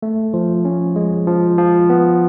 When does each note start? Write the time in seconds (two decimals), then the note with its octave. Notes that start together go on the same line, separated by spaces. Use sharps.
0.02 A3
0.34 F3
0.65 C#4
0.96 G#3
1.27 F3
1.58 F3
1.90 B3